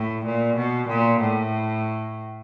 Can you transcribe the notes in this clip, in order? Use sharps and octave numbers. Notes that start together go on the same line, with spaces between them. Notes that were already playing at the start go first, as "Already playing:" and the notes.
Already playing: A2
A#2
B2
A#2
A2